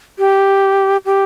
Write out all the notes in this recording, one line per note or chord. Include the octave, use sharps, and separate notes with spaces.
G4
G4